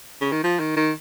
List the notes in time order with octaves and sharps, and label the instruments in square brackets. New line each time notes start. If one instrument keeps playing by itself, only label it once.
[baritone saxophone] C#3
D#3
F3
D#3
D#3